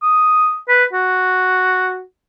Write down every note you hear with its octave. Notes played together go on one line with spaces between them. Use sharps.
D#6
B4
F#4